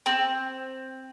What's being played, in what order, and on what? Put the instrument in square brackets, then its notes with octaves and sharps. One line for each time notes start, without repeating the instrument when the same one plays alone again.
[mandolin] C4